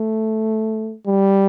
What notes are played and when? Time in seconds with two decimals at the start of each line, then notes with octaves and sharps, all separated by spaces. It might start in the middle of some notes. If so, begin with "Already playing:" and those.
Already playing: A3
1.07 G3